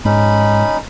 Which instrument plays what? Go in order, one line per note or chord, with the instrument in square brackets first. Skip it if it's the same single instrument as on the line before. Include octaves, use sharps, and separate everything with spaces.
[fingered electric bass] G#2 [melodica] C#4 D#4 B5